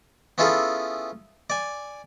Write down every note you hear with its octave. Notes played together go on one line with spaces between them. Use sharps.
B3 C#4 E4 F4 G#4 A4
D5 G#5